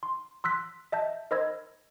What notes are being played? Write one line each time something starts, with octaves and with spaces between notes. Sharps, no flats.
C6
C6 E6 F#6 B6
D#5 E5 A5 G6
A#4 C5 D#5 B5 E6 G#6